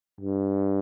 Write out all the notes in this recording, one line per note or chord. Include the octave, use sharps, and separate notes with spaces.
G2